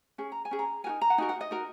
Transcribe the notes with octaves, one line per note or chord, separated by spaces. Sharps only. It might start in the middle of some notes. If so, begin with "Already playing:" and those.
C#4 G#4
A#5
G#5
C#4 G#4
A#5
D#4 F#4 A#4 G#5
A#5
F#5
D#4 F#4 A#4 G#5
F#5
D#5
D#4 F#4 A#4